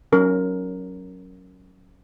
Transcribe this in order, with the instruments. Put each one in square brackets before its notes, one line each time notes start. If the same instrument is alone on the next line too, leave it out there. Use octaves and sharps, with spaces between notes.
[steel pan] F#3 C#4 A#4